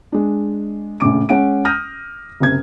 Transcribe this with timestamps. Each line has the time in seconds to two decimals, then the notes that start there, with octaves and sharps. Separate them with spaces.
0.12 G#3 D4
1.00 A#1 A2 C#3 D6 D7
1.29 G#3 C#4 F#5 D7
1.65 D#6 F6 G6 A#6 D#7
2.40 F#1 C3 G#6